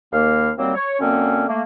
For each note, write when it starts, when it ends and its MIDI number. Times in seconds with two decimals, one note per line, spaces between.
0.13 0.50 39
0.13 0.50 58
0.13 0.50 77
0.58 0.71 39
0.58 0.71 54
0.58 0.71 55
0.58 0.71 58
0.58 0.71 60
0.75 0.98 73
1.00 1.46 42
1.00 1.46 50
1.00 1.46 58
1.00 1.46 60
1.00 1.46 61
1.48 1.63 57
1.48 1.63 58